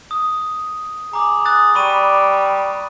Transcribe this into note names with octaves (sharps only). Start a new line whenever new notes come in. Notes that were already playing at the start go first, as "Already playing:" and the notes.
D#6
G#4 A#5 D6
D#6 F#6 A6
G3 B5 C#6 D#7